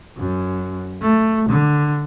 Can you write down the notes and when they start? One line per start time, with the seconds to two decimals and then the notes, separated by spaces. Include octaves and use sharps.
0.18 F#2
1.02 A3
1.50 D3